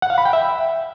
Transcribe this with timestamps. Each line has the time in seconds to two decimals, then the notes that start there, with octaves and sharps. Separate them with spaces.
0.02 F#5
0.10 F5
0.18 B5
0.25 G5
0.33 E5